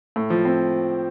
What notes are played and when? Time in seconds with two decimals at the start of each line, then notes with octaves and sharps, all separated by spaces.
0.16 A2
0.30 F3
0.45 C4